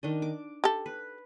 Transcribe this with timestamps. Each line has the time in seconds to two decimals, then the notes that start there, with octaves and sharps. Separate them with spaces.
0.03 D#3 D4 D#5
0.22 D6
0.64 G4 A4
0.86 B4